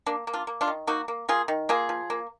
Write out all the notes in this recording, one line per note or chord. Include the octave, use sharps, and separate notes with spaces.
A#3 D4
A#3
D4 F4
A#3
D4 F4
D#3
A#3 D#4 F#4
A#3
A#3 F4 G#4
D#3
A#3 F4 G#4
F3
A#3